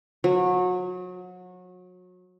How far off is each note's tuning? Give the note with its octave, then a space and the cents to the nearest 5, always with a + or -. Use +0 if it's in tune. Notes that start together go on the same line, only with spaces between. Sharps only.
F#3 -30